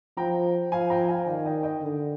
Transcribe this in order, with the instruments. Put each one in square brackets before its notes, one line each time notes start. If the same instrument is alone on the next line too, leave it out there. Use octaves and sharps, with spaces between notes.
[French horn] F3 [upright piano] G5 A#5
[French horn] F3 [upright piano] F5 G#5
[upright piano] G5 A#5
G5
F5 G#5
[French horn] D#3 [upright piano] D5 F5
[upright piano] D#5 G5
D#5 G5
[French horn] D3